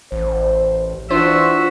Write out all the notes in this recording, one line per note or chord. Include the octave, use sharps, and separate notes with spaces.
A1 C5
E3 D4 F4 F#4 C5 E5